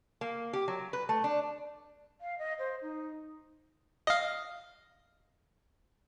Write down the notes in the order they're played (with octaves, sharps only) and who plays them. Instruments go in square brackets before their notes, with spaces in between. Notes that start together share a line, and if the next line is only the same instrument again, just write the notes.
[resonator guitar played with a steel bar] A#3
G4
F#3
B4
A3
D4
[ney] F5
D#5
C5
D#4
[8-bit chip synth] D#5 F5